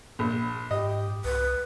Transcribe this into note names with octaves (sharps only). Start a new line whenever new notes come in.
A#1
G#2 G4 D#5
C2 B4